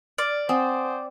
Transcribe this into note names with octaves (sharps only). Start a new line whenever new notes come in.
D5 F6
C4 C5 F#5 G#5 D#6